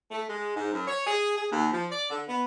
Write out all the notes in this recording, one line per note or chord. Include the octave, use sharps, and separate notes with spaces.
A3
G#3
G#2
F#2
C#5
G#4
G#4
D#2
F3
D5
D3
B3